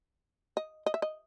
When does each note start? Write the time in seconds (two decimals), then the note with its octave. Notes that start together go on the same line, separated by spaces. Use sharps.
0.57 D#5
0.86 D#5
0.94 E5
1.02 D#5